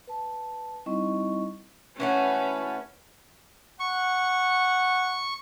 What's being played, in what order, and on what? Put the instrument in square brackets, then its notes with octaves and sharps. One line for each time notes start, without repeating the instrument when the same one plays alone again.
[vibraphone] B4 A5
G3 C4 D#4 E4 D#5 C#6
[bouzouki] E3 A3 F#4 [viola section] C#4 B4
[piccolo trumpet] F#5 [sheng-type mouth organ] C#6